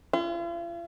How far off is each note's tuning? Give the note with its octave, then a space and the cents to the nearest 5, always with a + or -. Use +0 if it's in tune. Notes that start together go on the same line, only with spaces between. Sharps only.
F4 -45